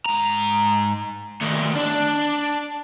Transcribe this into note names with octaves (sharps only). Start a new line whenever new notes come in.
G#2 A#5
D2 D#3
D4